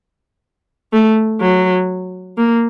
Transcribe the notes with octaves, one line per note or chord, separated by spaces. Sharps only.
A3
F#3
A#3